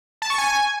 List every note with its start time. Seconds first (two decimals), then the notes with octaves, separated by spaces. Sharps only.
0.22 A5
0.30 C#6
0.38 G#5